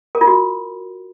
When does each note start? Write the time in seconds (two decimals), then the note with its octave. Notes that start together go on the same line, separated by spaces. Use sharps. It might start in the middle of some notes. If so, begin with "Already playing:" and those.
0.15 A#4
0.21 F4
0.27 F#4